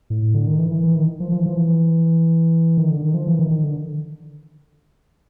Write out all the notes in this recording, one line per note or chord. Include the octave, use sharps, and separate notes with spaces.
A2
D3
D#3
E3
E3
E3
D#3
F3
F3
E3
F3
E3
D#3
D3
D#3
F3
E3
D#3
D#3
D3